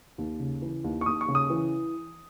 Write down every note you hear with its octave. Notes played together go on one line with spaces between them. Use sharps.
D#2
C#3
E3
D#2
C#6
D#2 D#6
C#6
C#3
D#6
E3